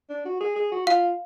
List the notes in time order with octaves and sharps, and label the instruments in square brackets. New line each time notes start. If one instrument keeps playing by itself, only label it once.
[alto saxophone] D4
F#4
G#4
G#4
F#4
[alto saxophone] F4 [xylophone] F5